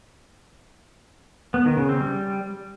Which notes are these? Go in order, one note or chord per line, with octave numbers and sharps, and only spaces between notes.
B3
D#3
C#3
C4
G3